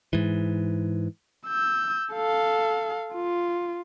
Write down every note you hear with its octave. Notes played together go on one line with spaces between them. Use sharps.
G#2 E3
E6 G6
A4 F5
F4